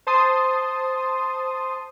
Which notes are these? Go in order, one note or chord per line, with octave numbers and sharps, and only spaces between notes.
C5 A5 C6 D#6